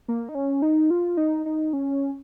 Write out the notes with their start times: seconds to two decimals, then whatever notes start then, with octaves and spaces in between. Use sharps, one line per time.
0.08 A#3
0.29 D#4
0.35 C#4
0.62 D#4
0.90 F4
1.17 D#4
1.46 D#4
1.73 C#4